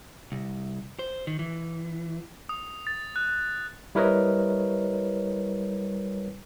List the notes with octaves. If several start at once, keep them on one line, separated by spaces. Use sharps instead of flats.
C2
C5
D#3
E3
D#6
A6
F#6
G3 E4 A#4 B4 C#5 D#5